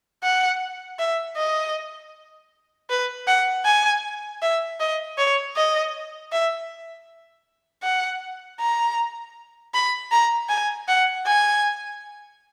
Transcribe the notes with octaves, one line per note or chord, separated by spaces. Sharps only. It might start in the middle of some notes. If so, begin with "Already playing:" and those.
F#5
E5
D#5
B4
F#5
G#5
E5
D#5
C#5
D#5
E5
F#5
A#5
B5
A#5
G#5
F#5
G#5